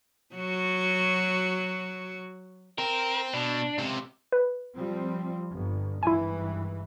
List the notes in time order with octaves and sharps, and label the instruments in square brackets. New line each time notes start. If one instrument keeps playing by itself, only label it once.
[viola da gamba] F#3 F#4
[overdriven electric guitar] C4 [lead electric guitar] A#4
[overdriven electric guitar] B2 [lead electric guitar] D4
[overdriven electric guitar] C#2 C3
[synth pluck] B4
[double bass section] F3 G3 C4
G1
[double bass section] G#1 G2 E3 [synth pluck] E4 G#5